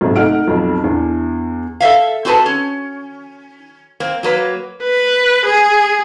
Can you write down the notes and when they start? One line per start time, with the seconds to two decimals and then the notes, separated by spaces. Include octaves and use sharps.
0.01 B1 G#2 C3
0.16 A3 D#4 F#5 F6 D7
0.48 B1 F2
0.84 E2 D4
1.80 A4 C5 E5 F5
2.25 C4 F#4 G#4 A4 B4 A5
2.46 C#4
4.00 A#3 C4
4.23 F#3 A#3 B4
4.83 B4
5.46 G#4